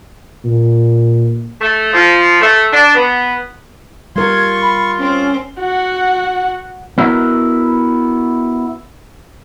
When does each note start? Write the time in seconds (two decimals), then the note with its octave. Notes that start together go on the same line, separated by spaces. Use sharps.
0.45 A#2
1.61 A3
1.94 F3
2.41 A3
2.73 D4
2.95 B3
4.16 G3 F4 A#4 C6 C#6 G#6
4.60 B5
4.99 C4 C#4 C5
5.59 F#4 F#5
6.98 B3 E4 F#4 A#4